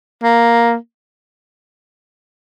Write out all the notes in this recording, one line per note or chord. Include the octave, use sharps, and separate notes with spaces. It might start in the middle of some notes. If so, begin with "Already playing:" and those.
A#3